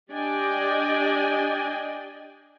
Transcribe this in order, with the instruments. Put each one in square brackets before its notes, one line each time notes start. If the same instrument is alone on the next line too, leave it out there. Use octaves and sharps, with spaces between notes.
[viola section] D4 G4 D5 D#5 G5 G#5